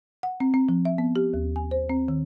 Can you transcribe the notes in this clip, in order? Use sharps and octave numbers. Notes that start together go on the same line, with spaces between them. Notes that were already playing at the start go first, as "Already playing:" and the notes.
F#5
C4
C4
F3
E5
B3
G4
D#2
G#5
C5
C4
D#3